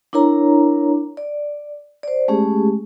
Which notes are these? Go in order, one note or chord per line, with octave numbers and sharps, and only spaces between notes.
D4 E4 A#4 C#5 A#5
D5
C5 D5
G#3 A3 C#4 G4 G#4